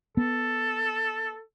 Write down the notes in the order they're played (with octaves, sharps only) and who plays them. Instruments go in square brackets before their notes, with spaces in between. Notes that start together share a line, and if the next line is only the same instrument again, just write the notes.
[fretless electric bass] B3 [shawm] A4